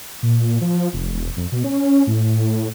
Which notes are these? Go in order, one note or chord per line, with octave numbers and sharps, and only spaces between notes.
A#2
F3
F1
E1
F2
B2
C#4
A2